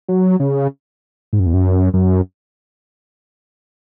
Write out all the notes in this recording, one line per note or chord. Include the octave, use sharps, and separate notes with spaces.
F#3
C#3
G#2
F#2
E2
F#2
F#2